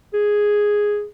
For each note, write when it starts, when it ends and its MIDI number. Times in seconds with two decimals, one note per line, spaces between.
0.14 1.06 68